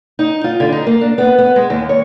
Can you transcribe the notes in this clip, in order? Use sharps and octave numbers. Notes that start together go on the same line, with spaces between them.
D#4
F4
D3
D#4
A#3
D4
B3
B3
G#3
D#2
C#5